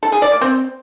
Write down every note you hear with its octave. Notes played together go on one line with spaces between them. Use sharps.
A4
G#4
D5
A#3
C4